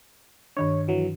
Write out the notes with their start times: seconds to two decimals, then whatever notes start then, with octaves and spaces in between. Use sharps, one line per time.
0.57 G2 D#3 D4 C#5
0.88 E3 F#3